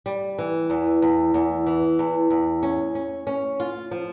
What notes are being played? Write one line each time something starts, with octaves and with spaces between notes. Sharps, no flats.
G3
E3
E2
E2
E2
E3
E2
E2
C#4
C#4
C#4
F4
F3